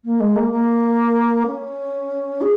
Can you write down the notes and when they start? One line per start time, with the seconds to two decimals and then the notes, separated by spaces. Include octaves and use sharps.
0.05 A#3
0.20 G#3
0.36 A#3
0.52 A#3
1.47 C#4
2.41 G#4